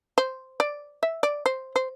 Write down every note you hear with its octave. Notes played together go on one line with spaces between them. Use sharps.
C5
D5
E5
D5
C5
C5